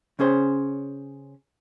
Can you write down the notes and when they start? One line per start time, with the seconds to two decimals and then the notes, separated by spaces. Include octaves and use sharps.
0.19 C#3 C#4 G#4 C5